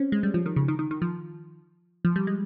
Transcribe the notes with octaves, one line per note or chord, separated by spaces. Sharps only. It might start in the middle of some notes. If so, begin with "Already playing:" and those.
Already playing: C4 C#4
G#3
G3
F3
D#3
C#3
D#3
D#3
D#3
F3
F3
G3
G#3